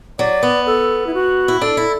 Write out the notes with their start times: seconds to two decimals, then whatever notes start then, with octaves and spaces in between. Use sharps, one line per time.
0.19 F#3 D5
0.43 B3
0.66 A4
1.07 E4
1.14 F#4
1.48 E4
1.61 D4 A4
1.77 E4